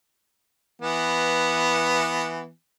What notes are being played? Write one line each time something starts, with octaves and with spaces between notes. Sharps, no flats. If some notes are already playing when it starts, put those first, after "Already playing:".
E3 B3